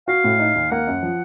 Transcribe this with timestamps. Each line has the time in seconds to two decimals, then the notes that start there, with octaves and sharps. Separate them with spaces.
0.08 F#4 F5
0.24 A2
0.40 D#4
0.55 D#2
0.71 A#3 F#5
0.87 F#2
1.03 F3